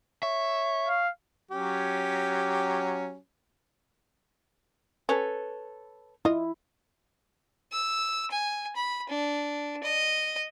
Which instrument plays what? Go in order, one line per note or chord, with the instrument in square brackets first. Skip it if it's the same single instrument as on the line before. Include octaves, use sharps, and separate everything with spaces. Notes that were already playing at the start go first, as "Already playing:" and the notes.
[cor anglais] C#5 [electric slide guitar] E5
[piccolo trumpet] F5
[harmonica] F#3 C#4 G4
[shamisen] C#4 [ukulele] A4 B4 C#5
[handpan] E4 [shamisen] F4 D#5
[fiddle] E6
G#5
B5
D4
D#5